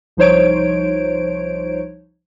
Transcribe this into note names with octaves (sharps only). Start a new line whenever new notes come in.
C2 F3 D#4 C5 C#5 D7